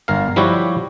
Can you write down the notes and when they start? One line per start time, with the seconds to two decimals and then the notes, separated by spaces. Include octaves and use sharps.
0.08 G1 A#4 F5
0.36 F3 G3 E4 F#4 G4 C#5